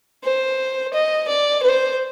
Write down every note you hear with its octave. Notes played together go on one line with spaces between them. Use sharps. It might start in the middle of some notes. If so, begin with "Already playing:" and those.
C5
D#5
D5
C5